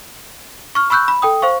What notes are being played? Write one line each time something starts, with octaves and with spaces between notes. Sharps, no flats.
C#6 F6
B5 C#6 E6 F#6 G6
B5
A4 G5 D#6
C5 F5 C#6